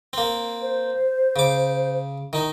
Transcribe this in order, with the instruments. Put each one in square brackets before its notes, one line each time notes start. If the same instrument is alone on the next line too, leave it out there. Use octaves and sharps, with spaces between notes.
[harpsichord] A#3 C4
[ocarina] C5
[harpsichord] C#3 D6
D#3 D#4